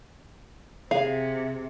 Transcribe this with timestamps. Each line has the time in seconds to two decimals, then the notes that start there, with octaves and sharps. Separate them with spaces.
0.91 C3 G#4 F5